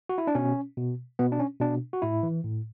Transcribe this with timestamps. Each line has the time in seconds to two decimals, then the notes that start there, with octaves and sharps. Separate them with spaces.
0.09 F#4
0.18 E4
0.27 D4
0.35 B2 C#4
0.77 B2
1.19 B2 B3
1.32 D4
1.40 C#4
1.60 B2 D4
1.93 F#4
2.02 A2 E4
2.23 E3
2.44 A2